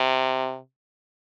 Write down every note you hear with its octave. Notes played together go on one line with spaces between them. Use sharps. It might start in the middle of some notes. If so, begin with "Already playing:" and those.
Already playing: C3